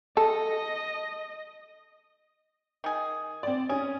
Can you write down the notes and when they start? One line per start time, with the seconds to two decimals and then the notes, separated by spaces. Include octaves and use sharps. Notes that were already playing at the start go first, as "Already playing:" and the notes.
0.17 A4 D#5
2.84 D#3 G#4
3.43 C4 D5
3.69 C#4 G#4